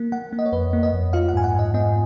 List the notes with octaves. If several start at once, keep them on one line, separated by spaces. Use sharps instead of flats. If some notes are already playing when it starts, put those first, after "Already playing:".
Already playing: A#3
A#3 F#5
A#3
D#5
C#5
F2 B4
A#3
D#5
F2
F4 F5
F#5
G#2 G#5
F#5
G#2 D#5
B3 D#5